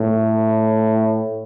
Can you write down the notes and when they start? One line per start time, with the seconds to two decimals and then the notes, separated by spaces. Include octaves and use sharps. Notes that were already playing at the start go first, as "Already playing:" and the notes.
Already playing: A2